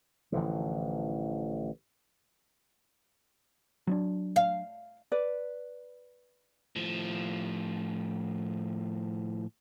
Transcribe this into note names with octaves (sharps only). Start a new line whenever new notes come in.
A1 D3 E3 F3
F#3 C#4 D4
F5
B4 D5
A2 F3